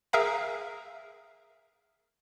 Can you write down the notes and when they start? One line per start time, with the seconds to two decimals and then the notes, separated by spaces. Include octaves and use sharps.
0.13 G#4 A#4 E5 F5 A#5